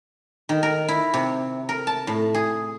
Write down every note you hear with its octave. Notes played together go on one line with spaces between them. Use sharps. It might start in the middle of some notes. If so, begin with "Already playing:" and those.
D#3
A#4
E4
C3
A#4
A5
A2
G#4